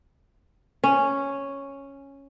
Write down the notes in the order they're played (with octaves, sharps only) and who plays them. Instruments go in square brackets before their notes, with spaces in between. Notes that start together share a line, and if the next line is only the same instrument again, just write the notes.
[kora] C#4